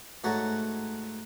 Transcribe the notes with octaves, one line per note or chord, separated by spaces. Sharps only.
G#2 A3 F#4 C#5 A5 A#5